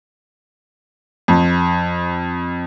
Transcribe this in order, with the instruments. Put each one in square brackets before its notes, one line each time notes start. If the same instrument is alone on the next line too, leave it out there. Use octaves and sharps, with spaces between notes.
[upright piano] F2